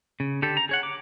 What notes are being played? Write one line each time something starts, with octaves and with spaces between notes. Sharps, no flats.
C#3
D3 G4 A4
A#5
G#4 C#5 F#5
D6